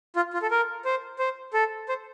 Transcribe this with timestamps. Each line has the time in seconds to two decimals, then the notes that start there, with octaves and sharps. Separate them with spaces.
0.16 F4
0.33 F4
0.42 A4
0.51 A#4
0.85 C5
1.19 C5
1.53 A4
1.89 C5